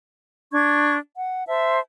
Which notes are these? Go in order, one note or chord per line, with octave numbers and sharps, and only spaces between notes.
D4 C#6 G#6
F#5
C5 E5 A5